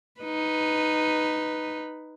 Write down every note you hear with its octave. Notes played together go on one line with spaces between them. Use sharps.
D#4 B4